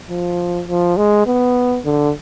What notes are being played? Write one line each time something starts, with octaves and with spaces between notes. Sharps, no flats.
F3
F3
G#3
B3
D3